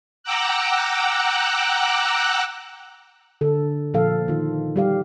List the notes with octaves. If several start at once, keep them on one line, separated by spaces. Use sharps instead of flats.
F#5 G5 A#5 D6 E6 F#6
D3 A4
A#2 F3 A4 F5
D#3 F4
G3 G4 F5